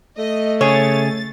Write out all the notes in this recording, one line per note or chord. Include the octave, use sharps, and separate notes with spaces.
A3 D#5
C#3 G#4 C#5 A6